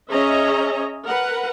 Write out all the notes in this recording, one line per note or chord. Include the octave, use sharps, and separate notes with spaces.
C#4 G#4 C#5 D#5 E5 A#5
A#4 B4 F#5